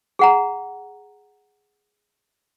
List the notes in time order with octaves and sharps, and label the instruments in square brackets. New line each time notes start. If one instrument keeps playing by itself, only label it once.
[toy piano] G#4 F#5 A#5